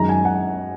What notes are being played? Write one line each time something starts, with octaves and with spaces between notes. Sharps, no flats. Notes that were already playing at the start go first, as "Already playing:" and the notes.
Already playing: F#2 D#3 G#3 D#4 A#5
G#5
F#5